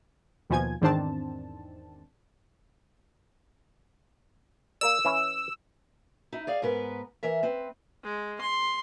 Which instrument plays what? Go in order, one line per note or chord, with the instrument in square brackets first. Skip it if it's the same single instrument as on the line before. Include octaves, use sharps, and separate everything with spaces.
[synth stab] D#2 B2 F3 G#5 G#6
E2 G#2 D#3 C4 D4 A5
[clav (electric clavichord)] A#3 A#4 D5 [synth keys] E6
[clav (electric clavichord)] E3 C#4 E4
[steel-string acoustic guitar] D#4 E4
G#4 D5 F5
G#2 B3 A#4 B4
E3 A#4 E5
C4 B4
[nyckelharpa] G#3
C6